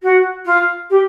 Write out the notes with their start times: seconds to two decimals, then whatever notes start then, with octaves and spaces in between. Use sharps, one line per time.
0.03 F#4
0.45 F4
0.90 G4